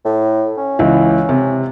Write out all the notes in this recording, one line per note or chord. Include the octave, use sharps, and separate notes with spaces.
A2
C#4
C#2 E3
C3